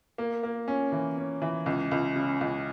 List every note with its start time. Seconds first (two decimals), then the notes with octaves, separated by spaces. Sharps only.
0.18 A#3
0.43 A#3
0.68 C#4
0.92 E3
1.18 C#4
1.42 E3
1.66 C#2
1.91 C#2
2.16 C#3
2.41 C#2